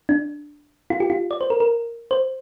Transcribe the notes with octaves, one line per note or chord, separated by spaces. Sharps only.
D4
F4
G4
F4
D5
C5
A#4
A#4
C5